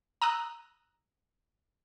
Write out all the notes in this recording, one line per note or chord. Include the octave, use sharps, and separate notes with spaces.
A#5 D#6 E6 F#6